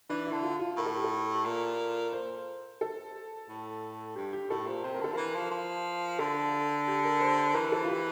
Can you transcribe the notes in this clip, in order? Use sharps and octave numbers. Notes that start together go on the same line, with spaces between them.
E3 D4
E4
D3
F4
F4
A2 A#4
A4
G4
A4
A#2
C5
A4
A2
G2 G4
G4
A2 A4
A#2 C5
C3 C5
A#4
D3 A4
E3 F3 A#4
F3
F3
D3 A4
G4
A#4
C5
C5
E3 A#4
A4
F4
G4